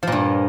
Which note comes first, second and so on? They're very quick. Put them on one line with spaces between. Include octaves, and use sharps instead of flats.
F3 A#2 G2